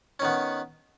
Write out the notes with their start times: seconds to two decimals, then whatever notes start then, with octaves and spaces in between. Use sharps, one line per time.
0.19 C#4
0.22 D#3
0.24 B3